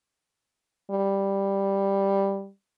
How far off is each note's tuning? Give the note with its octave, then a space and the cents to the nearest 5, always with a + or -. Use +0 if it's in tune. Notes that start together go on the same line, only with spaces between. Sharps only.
G3 +5